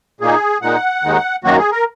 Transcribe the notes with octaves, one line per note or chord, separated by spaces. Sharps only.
A#2 A#3 D#4 G#4
A#2 G#3 D#4 F#5
D#2 D#3 G#3 D#4
F#2 D#3 F#3 A#3 F#4
G#4
A#4